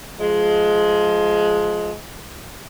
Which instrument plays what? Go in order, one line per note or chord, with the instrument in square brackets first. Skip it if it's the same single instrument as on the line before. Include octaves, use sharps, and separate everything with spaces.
[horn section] F3 G#3